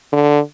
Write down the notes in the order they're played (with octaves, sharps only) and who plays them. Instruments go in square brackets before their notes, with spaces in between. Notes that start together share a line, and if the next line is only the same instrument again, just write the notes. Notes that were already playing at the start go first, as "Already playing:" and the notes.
[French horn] D3